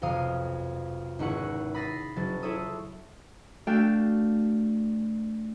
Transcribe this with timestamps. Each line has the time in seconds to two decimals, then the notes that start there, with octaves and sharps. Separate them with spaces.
0.02 B1 F2 C3 F5 D#6
1.19 G#1 C#2 E4 F#5 C#6
1.75 B5 D#6 A6 A#6 C7
2.16 F#1 F#3 A6
2.43 E4 F4 A4 C#5 E5 D#6
3.67 A3 D4 F#4 A4 F5 G5